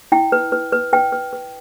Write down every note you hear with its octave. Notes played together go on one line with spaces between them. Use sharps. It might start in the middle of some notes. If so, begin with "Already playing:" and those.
E4 G5
B4
B4
B4
B4 G5
B4
B4